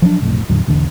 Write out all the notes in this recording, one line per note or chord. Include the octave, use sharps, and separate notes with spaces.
F3 F#3 B3 D4
F1 B1 F2 A2
E2 A2 D3 F#3
B1 E2 D3